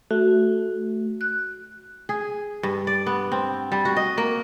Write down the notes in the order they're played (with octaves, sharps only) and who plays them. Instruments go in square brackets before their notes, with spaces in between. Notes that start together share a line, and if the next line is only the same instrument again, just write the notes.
[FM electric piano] A3 [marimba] F#4
[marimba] F#6
[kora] G#4
G2
D5
B3
C4
G3
F#4
D#5
A#3